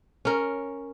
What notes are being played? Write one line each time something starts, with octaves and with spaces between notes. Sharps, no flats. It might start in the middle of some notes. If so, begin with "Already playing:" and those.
C#4 A#4